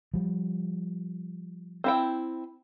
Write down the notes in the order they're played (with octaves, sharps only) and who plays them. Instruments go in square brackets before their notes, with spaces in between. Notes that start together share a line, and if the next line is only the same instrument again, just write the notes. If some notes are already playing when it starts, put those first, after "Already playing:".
[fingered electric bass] F3 G3
[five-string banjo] C4 E4 G5